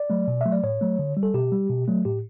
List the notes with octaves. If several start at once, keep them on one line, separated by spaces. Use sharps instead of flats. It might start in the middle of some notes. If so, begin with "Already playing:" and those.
Already playing: D5
F#3 A3
B2
F#3 A3 E5
D5
A2 C#5
F#3 A3
D3
G3
A4
B2 G4
G3
B2
F#3 A3
A2 G4